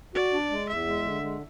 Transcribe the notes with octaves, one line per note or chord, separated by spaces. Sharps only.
F#4 D5
D4
G#3
E2 E5
G#3
D3
G#3